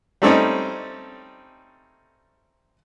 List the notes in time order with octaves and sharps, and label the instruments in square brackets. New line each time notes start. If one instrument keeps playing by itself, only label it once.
[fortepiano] G3 A3 C4 C#4 D#4